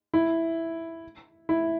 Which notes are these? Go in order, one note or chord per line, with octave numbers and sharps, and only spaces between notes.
E4
E4